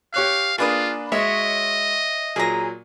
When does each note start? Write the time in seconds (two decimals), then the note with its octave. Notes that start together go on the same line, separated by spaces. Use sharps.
0.14 G4 C#5 F5 F#6
0.58 A#3 D4 F4 G#4 B4 D#6
1.12 G#3 F#4 C#5 D#5 E5
2.36 A#2 F#3 G#4 A#5